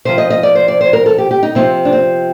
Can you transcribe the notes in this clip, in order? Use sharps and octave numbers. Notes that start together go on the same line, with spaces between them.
C3 F3 C5
D#5
D#5
D5
C5
D5
C5
A#4
A4
G4
G4
D#4
C3 F3 C4
D4
C4